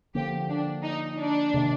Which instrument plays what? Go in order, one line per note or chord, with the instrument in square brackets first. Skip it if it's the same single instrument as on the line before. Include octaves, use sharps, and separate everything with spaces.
[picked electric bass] D3 F3 A#3 [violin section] G4
[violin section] D4
D#4
D4
[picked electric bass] C3 D#3